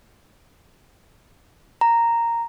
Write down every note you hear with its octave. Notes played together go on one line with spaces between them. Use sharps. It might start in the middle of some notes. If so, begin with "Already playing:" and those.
A#5